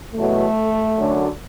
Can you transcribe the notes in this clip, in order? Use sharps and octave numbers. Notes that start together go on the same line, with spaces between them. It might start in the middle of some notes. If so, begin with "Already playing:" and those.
E2 B2 F#3 A3
F#2 D3 F#3